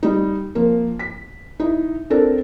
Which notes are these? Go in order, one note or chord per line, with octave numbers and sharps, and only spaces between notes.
G3 D#4
F3 A#3
B6
D#4 E4
C4 D4 A4 A#4